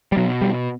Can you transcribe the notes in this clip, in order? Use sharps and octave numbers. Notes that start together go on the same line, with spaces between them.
G3
B2 F#3
G3